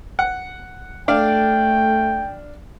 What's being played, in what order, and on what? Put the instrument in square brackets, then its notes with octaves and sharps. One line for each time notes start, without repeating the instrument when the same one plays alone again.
[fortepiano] F#5
[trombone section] A3 [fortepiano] D4 D5 F5 [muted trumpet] G5